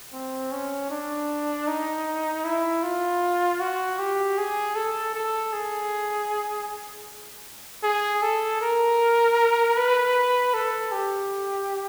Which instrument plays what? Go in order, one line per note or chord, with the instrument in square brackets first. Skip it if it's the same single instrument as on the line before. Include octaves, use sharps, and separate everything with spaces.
[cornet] C4
C#4
D4
D#4
E4
F4
F#4
G4
G#4
A4
A4
G#4
G#4
A4
A#4
B4
A4
G4